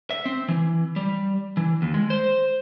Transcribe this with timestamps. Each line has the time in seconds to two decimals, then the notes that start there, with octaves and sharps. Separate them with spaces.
0.11 E5
0.26 C4
0.49 E3
0.96 G3
1.57 E3
1.82 D#2
1.94 G#3
2.10 C5